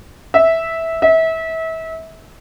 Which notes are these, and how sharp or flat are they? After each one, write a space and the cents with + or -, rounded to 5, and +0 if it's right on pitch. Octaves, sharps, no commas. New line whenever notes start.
E5 -10
E5 -30